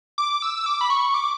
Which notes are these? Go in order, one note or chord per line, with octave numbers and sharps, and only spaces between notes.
D6
E6
E6
D6
B5
C#6
D6